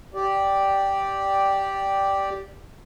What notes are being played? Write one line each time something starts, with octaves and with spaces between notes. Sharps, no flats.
G4 D5